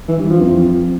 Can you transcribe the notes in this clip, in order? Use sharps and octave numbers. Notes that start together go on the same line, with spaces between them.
E3
G2
F3
F2